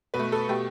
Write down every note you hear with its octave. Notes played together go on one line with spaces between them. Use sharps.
B2 B4
A3
A4
B2 A3 G4